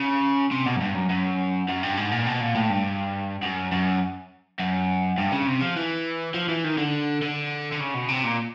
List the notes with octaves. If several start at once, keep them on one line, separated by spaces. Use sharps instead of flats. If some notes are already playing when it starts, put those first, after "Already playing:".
Already playing: C#3
C3
B2
F#2
G2
F#2
F#2
F#2
G2
G#2
A#2
B2
A#2
A2
G2
F#2
F#2
F#2
G2
C#3
C3
F3
E3
F3
E3
D#3
D3
D3
D3
C#3
B2
C3
A#2